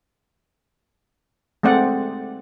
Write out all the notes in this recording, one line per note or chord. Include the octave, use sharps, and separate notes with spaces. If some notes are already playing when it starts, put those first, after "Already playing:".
G#3 A3 C4 D5 F#5